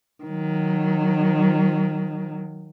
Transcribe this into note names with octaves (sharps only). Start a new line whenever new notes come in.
D#3 F#3